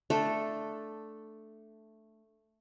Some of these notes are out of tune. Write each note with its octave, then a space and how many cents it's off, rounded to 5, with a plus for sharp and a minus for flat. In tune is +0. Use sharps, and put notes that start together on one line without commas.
A3 +0 D4 +5 A4 +0